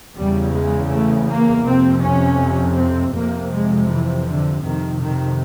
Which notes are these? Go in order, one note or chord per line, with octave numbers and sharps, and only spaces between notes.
E2 C#3 G3
G#3
A3
A#3
F2 C3 C4
C#4
C4
F2 C3 A#3
G#3
E3
D3
F2 C3 D#3
D#3